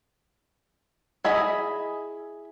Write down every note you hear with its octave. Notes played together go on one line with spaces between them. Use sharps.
E4 G#4 D#5 B5